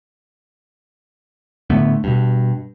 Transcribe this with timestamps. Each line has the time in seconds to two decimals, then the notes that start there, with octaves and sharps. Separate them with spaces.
1.70 A2 D3 A3 B3
2.04 G2 B2